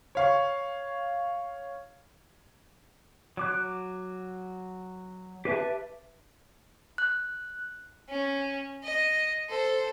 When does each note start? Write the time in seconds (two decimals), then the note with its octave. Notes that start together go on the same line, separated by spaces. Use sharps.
0.15 C#5 F5 C#6
3.37 F#3 D6 F#6
5.45 G4 B4 E5 A5
6.98 F#6
8.09 C#4
8.84 D#5
9.49 A4 C5